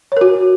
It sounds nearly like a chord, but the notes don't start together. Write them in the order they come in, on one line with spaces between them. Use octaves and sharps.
C#5 A#4 F#4